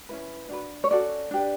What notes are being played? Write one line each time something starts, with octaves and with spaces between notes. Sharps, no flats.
C#4 E4 B4
D4 F#4 B4
C#5
C#4 F#4 A4 D5
D4 G4 B4